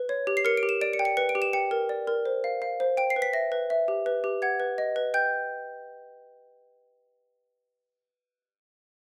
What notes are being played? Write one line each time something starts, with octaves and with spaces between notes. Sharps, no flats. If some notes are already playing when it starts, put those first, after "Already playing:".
Already playing: B4
C#5
G4
C7
A#4 C#7
D7
G4
E7
D5 D7
C#7
G5
C#7
B4 C#7
D7
G4
E7
G5 C#7
A#4
D5
A#4
C5
F5
F5
C5
G5 D7
C7
B4
B6
E5 A#6
B4
E5
G4
B4
G4
F#5 G#6
B4
D#5
B4
G5 G6